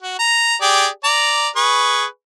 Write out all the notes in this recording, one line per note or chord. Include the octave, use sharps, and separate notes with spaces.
F#4
A#5
G4 G#4 D5
D5 A#5
G#4 B4 C#6